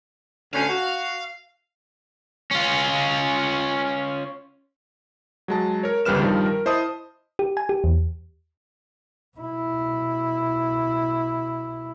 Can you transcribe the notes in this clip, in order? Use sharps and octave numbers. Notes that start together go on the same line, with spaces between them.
D2 C#4 F5
F#4
C#4 F4
F#3 G#3 A5
A#4 C#5
G1 C#2 G3 B4 F6 E7
G2 D#3 F3 G3
A#4
E4 C5 D#5 A5 D#6
G4
G#5
G4
E2
B2 E4